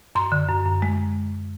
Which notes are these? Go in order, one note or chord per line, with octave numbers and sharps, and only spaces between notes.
F#2 C6
D3
F#2
F#2
G#3